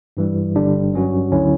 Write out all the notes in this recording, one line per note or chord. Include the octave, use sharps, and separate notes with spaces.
G2 E3 G3
G1 G2 D3 G3 D4
G2 F#3 C#4 F#4
D2 D3 F#3 C#4 E4